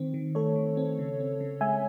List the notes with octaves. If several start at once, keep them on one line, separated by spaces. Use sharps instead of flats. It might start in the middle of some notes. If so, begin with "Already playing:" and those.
Already playing: D#3 C4
D#3
A3 A4 C#5
D#3
C4
C#3
C4
C#3
G#3 E5 G#5